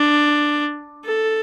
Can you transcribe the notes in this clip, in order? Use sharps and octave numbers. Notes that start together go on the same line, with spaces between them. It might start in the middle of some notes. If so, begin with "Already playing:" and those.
Already playing: D4
A4